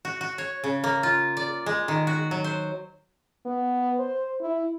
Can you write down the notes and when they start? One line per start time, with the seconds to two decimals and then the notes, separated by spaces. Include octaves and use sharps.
0.05 F#4
0.21 F#4
0.38 C#5
0.64 C#3
0.84 A#3
1.03 F4
1.37 D5
1.66 G#3
1.88 D#3
2.07 F#4
2.31 F#3
2.44 C5
3.45 B3
3.99 C5
4.41 E4